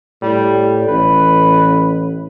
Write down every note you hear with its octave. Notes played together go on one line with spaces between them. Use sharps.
A2 G3
A1 B4